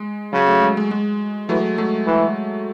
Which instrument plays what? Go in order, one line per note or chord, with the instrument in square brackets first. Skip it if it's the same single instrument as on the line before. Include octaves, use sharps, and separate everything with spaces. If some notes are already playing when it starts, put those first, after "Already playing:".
Already playing: [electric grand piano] G#3
[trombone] C#3 [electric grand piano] F#3
[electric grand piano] F#3 A3
G#3
G#3
G#3
[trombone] E3 [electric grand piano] F#3 A3
[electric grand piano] F#3 A3
[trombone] E3